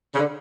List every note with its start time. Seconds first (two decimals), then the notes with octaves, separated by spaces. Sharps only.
0.14 C#3
0.18 D3